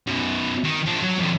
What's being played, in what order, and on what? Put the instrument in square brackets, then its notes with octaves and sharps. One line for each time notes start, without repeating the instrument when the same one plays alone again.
[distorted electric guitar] F#2 B2
D#3
F3 D4
F#3
F2 D3